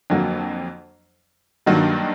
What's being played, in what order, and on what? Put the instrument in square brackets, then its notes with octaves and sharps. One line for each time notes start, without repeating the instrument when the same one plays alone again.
[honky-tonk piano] F2 D3 F#3 A#3
G2 D#3 F#3 A#3 D4